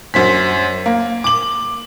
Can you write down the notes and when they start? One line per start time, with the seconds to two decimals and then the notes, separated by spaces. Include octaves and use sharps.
0.14 F#2 C5 B6
0.86 A#3
1.24 D6 F#7